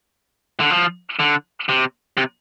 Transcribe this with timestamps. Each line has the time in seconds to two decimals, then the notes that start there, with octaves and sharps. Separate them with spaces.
0.60 D3
0.70 F3
1.19 D3
1.69 C3
2.17 C3